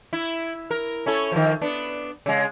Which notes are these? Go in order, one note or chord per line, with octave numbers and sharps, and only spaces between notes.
E4
A#4
C#4 E4 A4
D#3 F3
B3 D4
C#3 G#3